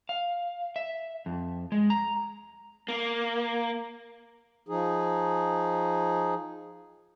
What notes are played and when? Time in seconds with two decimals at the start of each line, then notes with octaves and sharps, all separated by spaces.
0.09 F5
0.76 E5
1.26 F2
1.72 G#3
1.90 A#5
2.88 A#3
4.69 F3 D#4 G#4